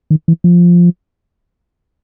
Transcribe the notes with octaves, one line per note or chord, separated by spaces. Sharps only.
D#3
E3
F3